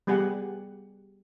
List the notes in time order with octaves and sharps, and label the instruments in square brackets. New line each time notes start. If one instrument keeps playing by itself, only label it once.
[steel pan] G3 B3 G4 G#4 F#5